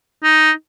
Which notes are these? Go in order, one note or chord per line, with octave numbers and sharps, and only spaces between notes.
D#4